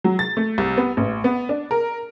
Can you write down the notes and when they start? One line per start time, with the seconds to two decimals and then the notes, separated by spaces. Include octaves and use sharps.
0.04 F#3
0.19 A6
0.37 A3
0.58 C2
0.77 B3
0.97 A1
1.24 B3
1.49 D4
1.71 A#4